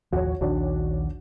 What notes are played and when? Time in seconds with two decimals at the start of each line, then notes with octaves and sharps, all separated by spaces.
0.12 A1 D#2 F3 F#4 C#5
0.41 A#1 D#2 D#3 D4 F#4 C#5